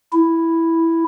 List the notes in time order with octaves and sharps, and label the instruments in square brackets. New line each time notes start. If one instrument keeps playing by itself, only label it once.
[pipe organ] E4